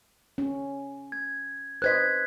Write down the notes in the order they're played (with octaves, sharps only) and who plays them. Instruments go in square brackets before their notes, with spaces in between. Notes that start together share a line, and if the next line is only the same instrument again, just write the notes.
[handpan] C#4
[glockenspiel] G#6
[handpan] B4 C5 D#5 [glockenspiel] F#6 G#6 B6